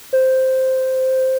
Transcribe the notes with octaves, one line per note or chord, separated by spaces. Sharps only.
C5